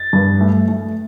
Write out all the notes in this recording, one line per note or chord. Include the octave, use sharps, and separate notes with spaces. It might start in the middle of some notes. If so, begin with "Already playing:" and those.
Already playing: A6
G2
A3
A3